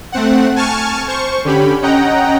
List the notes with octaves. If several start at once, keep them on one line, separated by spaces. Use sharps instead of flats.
A3 C4 F#5
G#5 A5 C#6 F6
C5 C#6
D3 C#4 G4 B5
C#4 D#5 F#5 G5 A#5